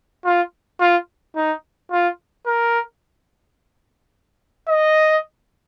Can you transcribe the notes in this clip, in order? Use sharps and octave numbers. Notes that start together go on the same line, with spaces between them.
F4
F4
D#4
F4
A#4
D#5